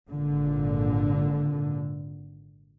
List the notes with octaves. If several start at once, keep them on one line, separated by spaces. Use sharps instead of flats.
G#1 A#2 D3